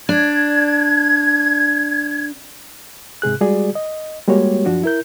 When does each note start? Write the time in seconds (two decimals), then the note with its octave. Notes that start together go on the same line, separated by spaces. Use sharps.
0.09 D4 G#6
3.22 G#2 C3 G#4 F#6
3.41 G3 G#3 F#4 G#4 D5
3.75 D#5
4.28 G3 G#3 A#3 F#4 G4 C#5
4.66 F#2 F3 D4 F#4
4.84 E4 A#4 G6